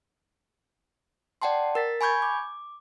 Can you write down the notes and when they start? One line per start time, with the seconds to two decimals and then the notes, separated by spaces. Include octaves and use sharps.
1.42 D5 F#5 G5 A5 C6
1.75 A#4 A6 B6
2.01 G#5 B5 C#6 G6 G#6
2.22 D6